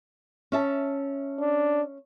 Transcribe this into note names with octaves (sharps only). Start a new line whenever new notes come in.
C#4 E5 A5
D4